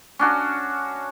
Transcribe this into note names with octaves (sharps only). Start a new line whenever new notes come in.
C#4 D4 F#4